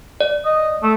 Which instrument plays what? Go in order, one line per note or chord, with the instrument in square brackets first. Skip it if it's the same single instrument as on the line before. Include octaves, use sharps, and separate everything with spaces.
[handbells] D5
[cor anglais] D#5
A3